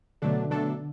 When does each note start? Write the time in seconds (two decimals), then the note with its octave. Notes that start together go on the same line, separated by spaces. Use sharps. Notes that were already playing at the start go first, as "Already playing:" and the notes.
0.22 B2 D3 F#3 A3 D4 A4
0.50 B2 F#3 A3 D4 A4